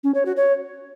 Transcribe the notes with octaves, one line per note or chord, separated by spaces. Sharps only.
C#4
C#5
F#4
C#5